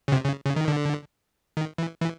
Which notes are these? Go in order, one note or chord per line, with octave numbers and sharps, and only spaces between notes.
C#3
C3
C#3
C#3
D#3
D3
D#3
E3
E3